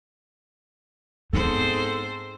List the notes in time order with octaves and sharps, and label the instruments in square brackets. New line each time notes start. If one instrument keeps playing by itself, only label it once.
[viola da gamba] G#2 C4 C5 [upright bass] B3 D#4 [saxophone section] A4